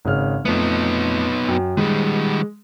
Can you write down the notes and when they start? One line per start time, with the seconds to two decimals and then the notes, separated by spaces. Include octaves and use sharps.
0.05 G#1 C#3 F6
0.45 F2 A3 B3 D#4
1.48 F#2 G5
1.77 D#3 G3 G#3